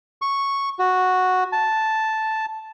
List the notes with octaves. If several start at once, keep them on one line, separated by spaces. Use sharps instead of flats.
C#6
F#4
A5